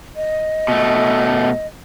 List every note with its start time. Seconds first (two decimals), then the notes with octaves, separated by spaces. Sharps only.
0.16 D#5
0.68 B2 A3